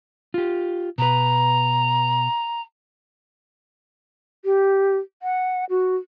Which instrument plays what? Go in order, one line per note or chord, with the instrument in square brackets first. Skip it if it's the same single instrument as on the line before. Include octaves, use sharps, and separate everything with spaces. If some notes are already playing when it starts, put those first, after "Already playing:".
[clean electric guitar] F4 G4
[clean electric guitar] B2 B4 [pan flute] A#5
[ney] G4
F#5
F#4